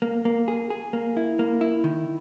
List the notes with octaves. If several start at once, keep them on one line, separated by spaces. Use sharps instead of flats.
A#3
A#3
G#4
G#4
A#3
E4
A#3
E4
D#3